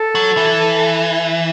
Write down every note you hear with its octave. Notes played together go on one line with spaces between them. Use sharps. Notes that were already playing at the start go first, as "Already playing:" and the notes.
Already playing: A4
F#3
E3